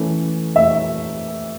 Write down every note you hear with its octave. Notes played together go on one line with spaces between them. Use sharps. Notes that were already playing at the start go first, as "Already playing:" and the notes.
Already playing: E3 A3 C#4
E5